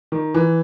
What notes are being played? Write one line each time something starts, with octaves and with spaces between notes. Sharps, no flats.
D#3
E3